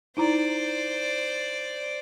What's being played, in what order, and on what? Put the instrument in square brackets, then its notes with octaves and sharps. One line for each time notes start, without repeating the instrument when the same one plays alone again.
[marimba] D#4 E4 A#5 [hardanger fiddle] C5 D5